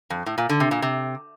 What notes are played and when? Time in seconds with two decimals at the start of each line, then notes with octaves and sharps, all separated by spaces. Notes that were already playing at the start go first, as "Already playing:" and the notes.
0.10 F2
0.26 A2
0.38 A#2
0.49 D3
0.60 C3
0.71 A#2
0.82 C3